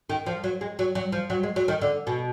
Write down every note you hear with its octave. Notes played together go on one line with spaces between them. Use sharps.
D#3
F3
F#3
G#3
F#3
F#3
F3
F#3
G#3
F#3
D#3
D3
B2